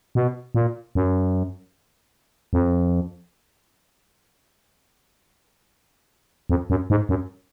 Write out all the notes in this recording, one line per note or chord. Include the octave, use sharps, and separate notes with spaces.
B2
A#2
F#2
F2
F2
F#2
G#2
F#2